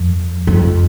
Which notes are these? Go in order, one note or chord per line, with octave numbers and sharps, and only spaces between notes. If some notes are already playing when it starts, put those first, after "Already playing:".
Already playing: F2
F2